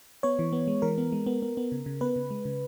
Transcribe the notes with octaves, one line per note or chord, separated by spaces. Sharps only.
B3 C#5
E3
B3
G#3
E3 A#4
B3
G#3
B3
B3
B3
C#3
C#3
B3 B4
C#3
G#3
C#3